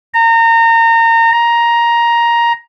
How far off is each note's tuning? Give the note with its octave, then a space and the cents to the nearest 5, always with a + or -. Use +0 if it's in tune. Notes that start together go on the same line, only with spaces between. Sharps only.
A#5 -30
A#5 +10